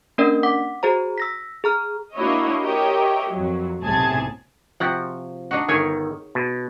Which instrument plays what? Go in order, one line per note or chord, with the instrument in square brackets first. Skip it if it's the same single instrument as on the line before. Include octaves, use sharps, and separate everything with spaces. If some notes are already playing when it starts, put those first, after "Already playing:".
[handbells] A#3 C#4 D4 A#4 D5 D#5
F#5 D6 B6
F#4 G#4 C5 A#5
E6 A#6 B6
G#4 A#5 F6
[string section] A#3 D4 E4 F#4 C#5 D#5
G4 A#4 C#5 D#5 E5 G5
F2 F#3
B1 A2 C3 G#4 A5 G#6
[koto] C3 F#4 F#5 [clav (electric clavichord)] F3
[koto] D4 D#4 F#4
[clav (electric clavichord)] G1 D#3 [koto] G#4 C#5 G#5
[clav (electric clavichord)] B2